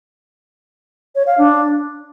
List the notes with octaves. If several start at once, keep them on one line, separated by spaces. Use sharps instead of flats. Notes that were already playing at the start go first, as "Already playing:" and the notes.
C#5
F5
D4